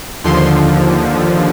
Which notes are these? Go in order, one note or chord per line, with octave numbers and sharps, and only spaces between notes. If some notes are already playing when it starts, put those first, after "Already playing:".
D#2 D3 F3 C6